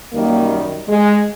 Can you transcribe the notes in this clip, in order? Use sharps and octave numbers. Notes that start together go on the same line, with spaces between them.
F#2 D#3 G3 A#3
G#3